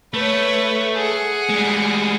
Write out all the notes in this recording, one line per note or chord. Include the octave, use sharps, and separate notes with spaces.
A3 B4 C#5
G#4 F#5
G3 G#3